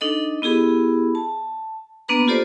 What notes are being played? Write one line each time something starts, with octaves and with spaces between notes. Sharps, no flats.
D4 D#4 A4 D#5
B3 E4 G4 G#4 B5
A5
A#3 B3 D4 B4 A#5
F4 G4 A4 C5 D5